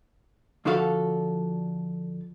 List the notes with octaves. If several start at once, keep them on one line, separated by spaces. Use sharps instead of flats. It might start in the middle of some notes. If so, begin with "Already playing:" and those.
D3 F3 D4 F#4 A4 F5